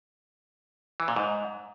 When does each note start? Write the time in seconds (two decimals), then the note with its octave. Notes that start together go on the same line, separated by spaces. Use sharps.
1.00 E3
1.08 A#2
1.16 G#2